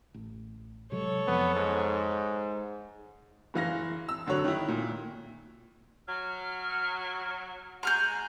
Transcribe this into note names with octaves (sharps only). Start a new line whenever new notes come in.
A1
C3 F#3 G#3 A4 C#5
F2 F3 F#3 B3
G#2
F#1 E3 F5 A#6
E6
F1 D3 F#3 C#5 F#6
D#3 E4
A#2
F#3 F6
G#3 F#4 G#5 A#5 F6 G6